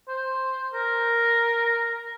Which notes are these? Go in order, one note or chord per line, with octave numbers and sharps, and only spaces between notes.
C5
A#4